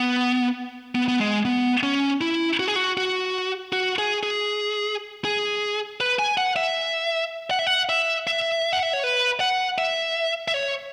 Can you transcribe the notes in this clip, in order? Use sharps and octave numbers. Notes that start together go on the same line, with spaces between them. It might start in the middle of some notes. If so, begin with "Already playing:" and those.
Already playing: B3
B3
B3
G#3
B3
C#4
E4
F#4
G#4
F#4
F#4
F#4
G#4
G#4
G#4
B4
G#5
F#5
E5
F#5
E5
F#5
E5
E5
F#5
E5
C#5
B4
F#5
E5
E5
C#5